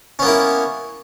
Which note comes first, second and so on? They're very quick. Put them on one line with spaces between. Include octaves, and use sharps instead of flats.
C#4 B3 A#3 E4